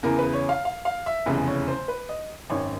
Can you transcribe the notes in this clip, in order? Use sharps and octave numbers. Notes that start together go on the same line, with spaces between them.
E2 C#3 E3 A#4
B4
C#5
F5
F5
F5
E5
F1 E2 C#3 E3
C#5
C5
B4
D#5
G#1 F#2 D#3 C#5